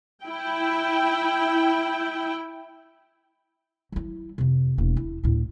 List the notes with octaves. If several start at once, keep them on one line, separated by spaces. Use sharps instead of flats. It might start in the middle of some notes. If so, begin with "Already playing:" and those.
E4 G5
F#3 E4
F2 C3
E1 A#3
E4
D2 A2